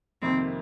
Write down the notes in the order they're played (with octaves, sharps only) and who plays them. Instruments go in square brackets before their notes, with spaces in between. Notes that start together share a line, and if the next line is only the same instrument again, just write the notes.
[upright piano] F2 C3 D#3 A#3 [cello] C4